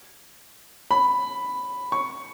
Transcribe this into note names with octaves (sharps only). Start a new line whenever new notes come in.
B5
C#6